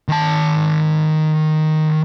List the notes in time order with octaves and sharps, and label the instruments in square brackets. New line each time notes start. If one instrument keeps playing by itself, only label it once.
[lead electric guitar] D#3 A5